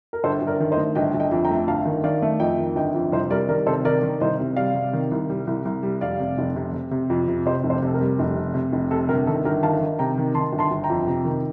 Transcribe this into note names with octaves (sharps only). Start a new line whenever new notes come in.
A#4
G1 A4 C5
G1
A#4 D5
D#3
C5 D#5
A3
G1 D#5 G5
G1
D#5 G5
F2
G5 A#5
A3
G1 F5 A5
D#3
D#3 D5 F5
A3
F2 D#5 G5
D#3
G1 D#5 G5
F2
C2 C5 D#5
G3 A#4 D5
D#3 A#4 D5
C3 A4 C5
D#3 A#4 D5
D#3
C2 C5 D#5
C3
G3 D5 F5
C3
D#3
C2
G3
C2
C2
G3
F1 D5 F5
C3
F1
C3
C3
C3
F2
C3
C3 C5 D#5
F1
A4 C5
C3 A4
A#4
G3
F1
C3
C3
F1
C3 A4
G1 A#4
D#3 A4
G1 A#4
D#3 F5 A5
D#3
C3 G5 A#5
D#3
D#3 A5 C6
G1
A5 C6
G1
G5 A#5
F2
C3
D#3